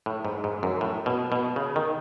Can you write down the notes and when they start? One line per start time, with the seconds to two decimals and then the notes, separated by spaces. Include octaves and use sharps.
0.06 A2
0.25 G#2
0.44 G#2
0.63 F#2
0.81 A2
1.06 B2
1.32 B2
1.56 C#3
1.76 D#3